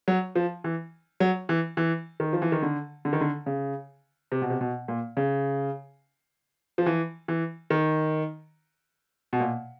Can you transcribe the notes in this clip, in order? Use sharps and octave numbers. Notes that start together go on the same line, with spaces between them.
F#3
F3
E3
F#3
E3
E3
D#3
F3
E3
D#3
D3
D3
D#3
D3
C#3
C3
B2
C3
B2
A#2
C#3
F3
E3
E3
D#3
B2
A#2